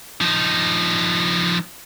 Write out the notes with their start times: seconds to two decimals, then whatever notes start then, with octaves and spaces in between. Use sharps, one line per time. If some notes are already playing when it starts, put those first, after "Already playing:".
0.21 F3 D#4